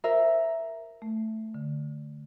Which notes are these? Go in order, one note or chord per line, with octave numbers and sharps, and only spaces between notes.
A#4 C5 E5
A3
D3